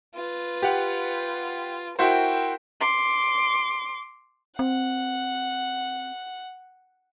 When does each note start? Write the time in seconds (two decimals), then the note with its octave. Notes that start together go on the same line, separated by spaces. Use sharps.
0.15 F4 B4
0.63 G4 F#5
1.99 E4 F#4 A#4 C5 G5
2.81 C6 D6
4.59 C4 F#5